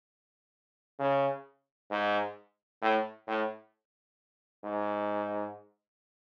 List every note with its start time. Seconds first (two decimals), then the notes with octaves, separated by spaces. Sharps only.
0.99 C#3
1.91 G#2
2.82 A2
3.27 A2
4.64 G#2